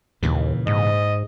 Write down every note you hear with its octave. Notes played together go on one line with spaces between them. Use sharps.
D#2 A#2 C#3 E3
G#2 D#5